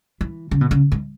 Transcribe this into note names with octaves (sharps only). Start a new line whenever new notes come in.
E3
C#3
B2
C#3
G#2